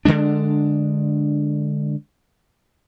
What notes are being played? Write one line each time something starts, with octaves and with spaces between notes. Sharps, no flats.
D3 F#3 G#3 D4